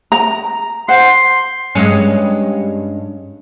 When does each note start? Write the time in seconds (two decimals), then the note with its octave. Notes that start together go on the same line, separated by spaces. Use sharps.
0.12 A#5
0.88 C5 F#5 C6
1.75 G2 G#3 C#4